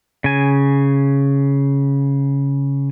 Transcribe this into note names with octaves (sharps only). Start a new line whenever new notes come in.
C#3 G#5